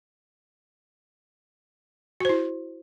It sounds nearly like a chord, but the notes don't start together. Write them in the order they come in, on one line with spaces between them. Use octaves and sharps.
F#4 C5 E4